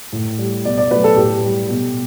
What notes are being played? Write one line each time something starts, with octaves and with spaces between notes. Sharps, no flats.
A2
G3
B2 D5
D5
F#3 A3 B4
A4
A2 G4
G3
B2